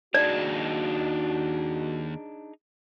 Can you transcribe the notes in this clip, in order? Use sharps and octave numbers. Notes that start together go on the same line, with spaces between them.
D#2 D4 D#4 F#4 G#4 D5 A5